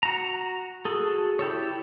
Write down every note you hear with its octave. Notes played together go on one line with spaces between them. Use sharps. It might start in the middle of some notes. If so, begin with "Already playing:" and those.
F#4 A#5
F#4 G#4 A4
E4 G4 A4 C#5